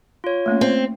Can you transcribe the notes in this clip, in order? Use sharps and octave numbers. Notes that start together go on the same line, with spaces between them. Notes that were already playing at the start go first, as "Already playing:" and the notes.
F4 C#5
A3 A#3 C#4
C4